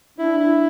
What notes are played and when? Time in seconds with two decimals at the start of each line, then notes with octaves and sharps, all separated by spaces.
0.18 D4 E4
0.40 E4